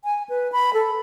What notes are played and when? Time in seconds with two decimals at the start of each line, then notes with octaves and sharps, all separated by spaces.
0.04 G#5
0.29 B4
0.52 B5
0.74 A4